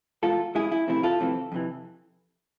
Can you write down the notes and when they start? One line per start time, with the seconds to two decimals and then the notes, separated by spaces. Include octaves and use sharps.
0.23 E2 B2 G#3 F4 A4
0.55 E2 B2 G#3 E4 G#4
0.72 E4
0.87 F2 C3 E3 A3 C4 E4
1.03 F4 A4
1.20 F2 C3 E3 A3 C4
1.52 F2 C3 E3